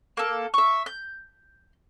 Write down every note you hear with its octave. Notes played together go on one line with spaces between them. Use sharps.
A#3 A4
E5 C#6
G6